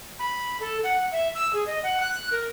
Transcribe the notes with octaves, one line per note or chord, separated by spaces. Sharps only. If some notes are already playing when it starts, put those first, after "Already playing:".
B5
A4
F#5
E5
E6
G#4
D#5
F#5
F#6
A#4